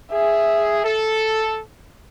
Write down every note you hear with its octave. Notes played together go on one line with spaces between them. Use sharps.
G#4 E5
A4